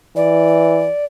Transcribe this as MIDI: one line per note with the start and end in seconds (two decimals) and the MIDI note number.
0.16 0.89 52
0.16 1.05 74